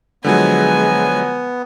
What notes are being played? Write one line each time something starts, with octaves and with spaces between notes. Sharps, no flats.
D3 F3 F#3 G#3 B3 G#5